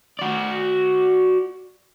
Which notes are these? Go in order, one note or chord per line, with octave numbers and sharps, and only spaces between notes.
F#4 D5